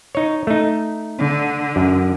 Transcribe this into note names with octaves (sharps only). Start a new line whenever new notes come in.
D#4 C#5
A3 D#4
D3
F#2